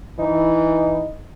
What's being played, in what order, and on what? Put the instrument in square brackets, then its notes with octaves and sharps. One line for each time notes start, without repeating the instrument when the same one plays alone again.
[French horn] E3 [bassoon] D#4